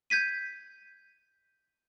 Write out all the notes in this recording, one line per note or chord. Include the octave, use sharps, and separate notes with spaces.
G6 G#6 B6 D#7